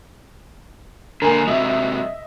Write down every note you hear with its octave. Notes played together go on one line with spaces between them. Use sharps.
D3 A#3 A#4 G#5
C3 F#3 D#5 E5